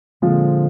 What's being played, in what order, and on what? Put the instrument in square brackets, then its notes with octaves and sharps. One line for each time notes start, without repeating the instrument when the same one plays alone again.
[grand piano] A#2 F3 G#3 C4 F4 [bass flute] D3